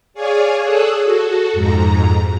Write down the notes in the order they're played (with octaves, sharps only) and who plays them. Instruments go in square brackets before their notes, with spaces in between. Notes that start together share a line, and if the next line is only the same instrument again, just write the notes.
[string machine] G#4 C#5 D5 F5 G#5
G#4 A4 C#5 D#6 E6 F#6
F#4 A4
F2 G#2 A#5